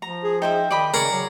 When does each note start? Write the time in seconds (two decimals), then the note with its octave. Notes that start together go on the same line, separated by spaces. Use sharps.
0.02 F3 A#5
0.24 G#4
0.42 D#4 C5 E5 G5
0.71 D#3 D5 D#5 B5
0.94 C#3 G#4 A#4 C#5 D5
1.12 F#3